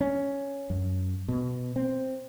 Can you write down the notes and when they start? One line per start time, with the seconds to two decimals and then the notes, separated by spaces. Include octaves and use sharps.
0.01 C#4
0.70 F#2
1.28 B2
1.76 C4